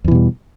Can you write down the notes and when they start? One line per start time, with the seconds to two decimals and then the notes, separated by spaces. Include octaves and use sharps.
0.04 E2
0.08 E3
0.11 B2
0.15 G3